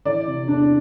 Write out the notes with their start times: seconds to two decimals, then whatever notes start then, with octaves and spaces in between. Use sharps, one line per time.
0.05 E3 D5
0.27 C3
0.48 E2 D4